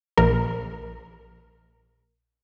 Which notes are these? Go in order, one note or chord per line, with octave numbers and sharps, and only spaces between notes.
A#1 A#4